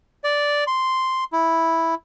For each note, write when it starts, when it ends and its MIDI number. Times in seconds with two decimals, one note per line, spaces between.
0.24 0.64 74
0.67 1.24 84
1.33 1.95 64